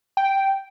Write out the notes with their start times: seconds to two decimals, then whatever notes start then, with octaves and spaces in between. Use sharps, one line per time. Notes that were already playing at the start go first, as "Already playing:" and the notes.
0.17 G5